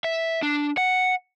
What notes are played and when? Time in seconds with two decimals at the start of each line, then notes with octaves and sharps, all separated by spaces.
0.04 E5
0.42 D4
0.77 F#5